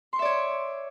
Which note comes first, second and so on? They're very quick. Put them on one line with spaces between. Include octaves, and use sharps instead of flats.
C6 C#6 E5 D5 C#5